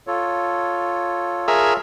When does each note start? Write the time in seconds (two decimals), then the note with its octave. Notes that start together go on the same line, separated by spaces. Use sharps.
0.07 F4 A4 C#5
1.48 G#4 A#4 E5